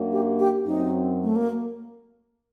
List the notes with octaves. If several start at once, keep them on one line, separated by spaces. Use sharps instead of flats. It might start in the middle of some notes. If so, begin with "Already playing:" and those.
Already playing: F#2 F#3 A#3 D4 F#4
G4
G4
F#2 F#3 C4 D#4
A3
A#3